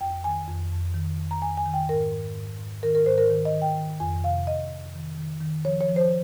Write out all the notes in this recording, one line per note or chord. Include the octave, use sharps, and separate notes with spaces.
F2 G5
D#3 G#5
F2
F2
D#3
F2
A#5
F2 G#5
G#5
D#3
G5
G#2 A#4
G#2
G#2
G#2
D#3 A#4
A#4
G#2 C5
A#4
D#3
D#5
D#3
G5
D#3
F2 G#5
C3 F5
F2 D#5
F2
D#3
D#3
D#3
F3 C#5
C#5
F3
C5